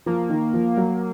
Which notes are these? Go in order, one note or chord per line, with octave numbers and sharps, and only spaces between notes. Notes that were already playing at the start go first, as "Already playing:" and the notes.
F3 A#3
D#3
F3
F#3